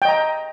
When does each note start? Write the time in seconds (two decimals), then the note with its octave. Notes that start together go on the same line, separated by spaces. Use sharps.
0.02 G5
0.05 D#5
0.09 A#5